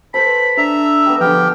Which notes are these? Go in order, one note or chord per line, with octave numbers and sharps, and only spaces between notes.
A4 B4 C5 B5 B6
D4 E5 A#5
E6
G3 B3
D3 F3 G4 G#4 F5 G5 F6